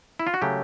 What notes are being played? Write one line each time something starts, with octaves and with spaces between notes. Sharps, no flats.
E4
F4
F#4
C#3 F#3 A3 G4